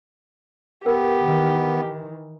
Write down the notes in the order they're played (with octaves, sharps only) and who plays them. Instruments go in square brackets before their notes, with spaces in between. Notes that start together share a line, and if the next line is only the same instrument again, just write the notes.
[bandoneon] B3 [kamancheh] G4 [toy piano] A#4
[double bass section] D#3 E3